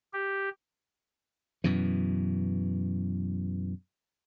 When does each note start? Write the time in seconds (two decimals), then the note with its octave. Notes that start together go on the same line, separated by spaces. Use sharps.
0.13 G4
1.64 F#2 B2 E3